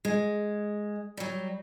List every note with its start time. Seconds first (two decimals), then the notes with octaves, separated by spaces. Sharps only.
0.05 G#3
1.17 F#3 G3